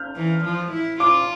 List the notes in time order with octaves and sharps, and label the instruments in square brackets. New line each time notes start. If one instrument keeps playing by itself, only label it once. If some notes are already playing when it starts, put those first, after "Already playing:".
Already playing: [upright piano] F6 G6
[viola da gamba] E3
F3
E4
[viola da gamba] F4 [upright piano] D6